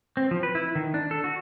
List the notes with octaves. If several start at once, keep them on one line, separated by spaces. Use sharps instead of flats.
C4
F3
B4
E4
D#3
D4
A4
F#4